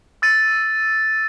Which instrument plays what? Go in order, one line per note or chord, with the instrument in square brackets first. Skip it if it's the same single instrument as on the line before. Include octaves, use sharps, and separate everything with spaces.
[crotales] E6 A6 D#7